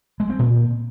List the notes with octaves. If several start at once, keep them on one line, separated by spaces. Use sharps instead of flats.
G#3
C4
A#2